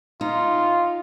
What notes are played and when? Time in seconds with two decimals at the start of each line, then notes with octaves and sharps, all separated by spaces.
0.21 D#4 F4